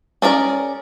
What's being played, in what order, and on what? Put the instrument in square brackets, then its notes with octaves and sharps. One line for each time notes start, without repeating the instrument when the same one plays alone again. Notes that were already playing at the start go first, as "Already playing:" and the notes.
[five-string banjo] C#4 D4 G#4 A#4 D5